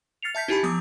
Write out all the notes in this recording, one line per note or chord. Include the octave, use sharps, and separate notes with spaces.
F6 A6 C7 C#7 F7
E5 A5 G6 B6
D#4 E4 G4 G#5 A5 B5
F3 B3 D6 D#6